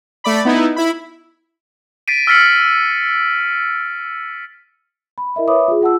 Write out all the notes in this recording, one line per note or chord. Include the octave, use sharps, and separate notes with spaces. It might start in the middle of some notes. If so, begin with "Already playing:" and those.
A3 D5 B5
B3 D#4 E4
E4 B5
A6 B6 C7 D7 D#7
E6 F6 A6 B6 C#7 F#7
B5
E4 A#4 D#5 E5
B4 C#5 E5 B5 D6 D#6
F4 G#4
F4 F#5 A5 E6